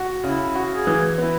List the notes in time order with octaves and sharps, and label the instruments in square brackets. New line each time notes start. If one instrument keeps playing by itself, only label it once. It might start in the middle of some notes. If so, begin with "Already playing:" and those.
Already playing: [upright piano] F#4
[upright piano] C#3 [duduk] E4
[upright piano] F#4
[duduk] G#4
[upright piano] E3
[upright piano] B3 [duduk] E4